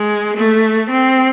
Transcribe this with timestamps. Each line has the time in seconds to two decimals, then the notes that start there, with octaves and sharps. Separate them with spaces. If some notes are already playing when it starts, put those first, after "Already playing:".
Already playing: G#3
0.36 A3
0.90 C4